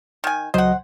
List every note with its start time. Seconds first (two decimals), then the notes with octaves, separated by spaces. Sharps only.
0.24 D#3 G#5
0.54 C#2 F#3 C5 D#5 F#5